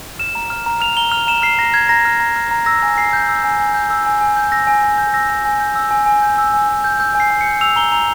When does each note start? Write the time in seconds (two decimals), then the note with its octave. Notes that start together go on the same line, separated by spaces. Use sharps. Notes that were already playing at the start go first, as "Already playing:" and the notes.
0.19 F6 E7
0.35 A#5
0.50 F6
0.66 A#5
0.81 F6 F7
0.97 A#5 G7
1.11 F6 F7
1.27 A#5 E7
1.42 F6 C7
1.59 A#5 A#6
1.74 F6 G#6
1.89 A#5 A#6
2.05 F6
2.20 A#5
2.36 F6
2.51 A#5
2.66 E6 A#6
2.82 G#5
2.97 G#5 C7
3.13 G6
3.29 E6
3.44 G#5
3.60 G#5
3.74 G6
3.90 E6
4.06 G#5
4.21 G#5
4.37 G6
4.52 E6 A#6
4.67 G#5
4.83 G#5
4.98 G6
5.14 E6 A#6
5.30 G#5
5.45 G#5
5.60 G6
5.75 E6
5.91 G#5
6.06 G#5
6.22 G6
6.38 E6
6.54 G#5
6.68 G#5
6.84 G6
7.00 E6 G6
7.15 G#5
7.20 C7
7.31 G#5
7.41 C#7
7.46 G6
7.61 E6 F7
7.76 A#5 G7
7.92 A#5 F7